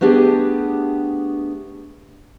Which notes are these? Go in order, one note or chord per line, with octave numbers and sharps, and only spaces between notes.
A3 B3 D4 G4 G#4